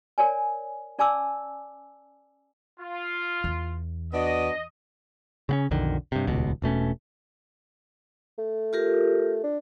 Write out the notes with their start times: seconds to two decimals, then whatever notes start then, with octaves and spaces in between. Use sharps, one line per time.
0.18 A#4 C#5 D5 G#5
0.99 C#4 D5 G#5 A5 D6 E6
2.80 F4
3.44 E2
4.13 B3 D4 F#4 D#5
5.49 C#3 B3 C#4
5.71 B1 F2 D3 D#3
6.12 G2 C3
6.27 D#1 C#2 B2
6.62 E1 B2 A3 C#4
8.39 A3
8.73 F4 G4 A#4
9.44 D4